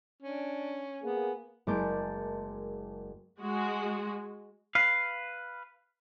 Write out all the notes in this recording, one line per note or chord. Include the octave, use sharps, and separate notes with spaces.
C#4 D4
A#3 B3 G#4
F#1 G#3 A#3 A5 D6 G6
G#3 F#4
B4 F5